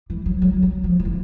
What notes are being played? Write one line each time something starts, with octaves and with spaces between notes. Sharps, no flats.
E3
F#3
F#3
F#3
F3
F3
E3